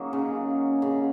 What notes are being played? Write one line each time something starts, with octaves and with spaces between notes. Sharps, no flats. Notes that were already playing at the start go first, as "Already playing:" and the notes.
Already playing: F#3 A#3 C#4 D#4 F#4 G#4
C#3
C#3